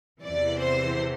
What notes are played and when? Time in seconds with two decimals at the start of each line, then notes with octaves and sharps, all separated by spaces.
0.23 E2 C3 E3 D5
0.59 C5